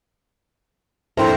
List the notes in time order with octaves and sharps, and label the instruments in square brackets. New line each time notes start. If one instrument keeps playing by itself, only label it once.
[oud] F2 A#2 [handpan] D4 C5 [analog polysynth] E4 A#5 [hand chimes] E5 G5